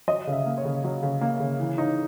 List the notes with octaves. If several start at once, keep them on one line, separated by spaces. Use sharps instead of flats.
F#3 D#5
C#3
E5
A#3
C#5
C#3
F#3
C#3
A#3
C#3
E3
D#4